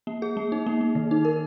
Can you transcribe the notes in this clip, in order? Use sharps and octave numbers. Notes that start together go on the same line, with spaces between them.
A#3
G#4
A#3
D#4
A#3
A#3
D#3
D#4
A#4